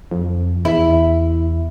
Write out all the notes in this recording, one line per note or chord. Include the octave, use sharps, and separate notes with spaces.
F2
E2 E4